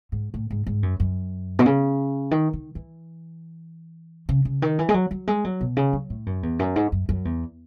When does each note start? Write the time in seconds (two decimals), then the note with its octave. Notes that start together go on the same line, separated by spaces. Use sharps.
0.12 G#2
0.34 A2
0.51 G#2
0.67 G#2
0.83 F#2
1.00 F#2
1.59 B2
1.66 C#3
2.31 D#3
2.53 D#3
2.75 E3
4.29 C#3
4.45 C#3
4.62 D#3
4.79 E3
4.89 G#3
4.94 F#3
5.11 F#3
5.27 G#3
5.44 F#3
5.61 B2
5.77 C#3
5.93 F#3
6.10 A2
6.26 F#2
6.43 E2
6.59 F#2
6.76 G#2
6.92 F#2
7.09 F#2
7.25 E2